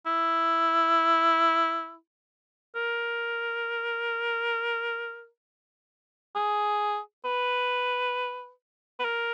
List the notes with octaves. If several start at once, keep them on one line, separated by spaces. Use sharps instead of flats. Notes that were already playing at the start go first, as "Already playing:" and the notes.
E4
A#4
G#4
B4
B4
A#4